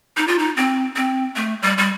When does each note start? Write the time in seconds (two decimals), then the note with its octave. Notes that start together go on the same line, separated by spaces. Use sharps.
0.17 D#4
0.28 F4
0.39 D#4
0.57 C4
0.96 C4
1.36 A3
1.62 G3
1.78 G3